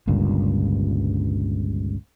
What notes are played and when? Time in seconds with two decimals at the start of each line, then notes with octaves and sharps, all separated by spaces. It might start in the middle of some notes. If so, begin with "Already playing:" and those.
0.07 G1 C#2 G2 A#2